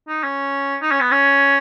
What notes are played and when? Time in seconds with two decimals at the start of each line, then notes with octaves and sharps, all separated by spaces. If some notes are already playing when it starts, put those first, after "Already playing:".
0.08 D#4
0.23 C#4
0.82 D#4
0.91 C#4
1.01 B3
1.11 C#4